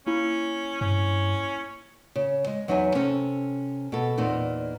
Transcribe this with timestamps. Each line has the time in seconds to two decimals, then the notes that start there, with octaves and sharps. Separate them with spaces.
0.07 A#3 C#4 E4
0.81 G2 C#4
2.16 C#3
2.47 G#3
2.68 E2 F#3 D#4 E5 G#5
2.95 C3 C#4 A4
3.92 B2 A4
4.18 E2 A#2 A#3 C4 D#4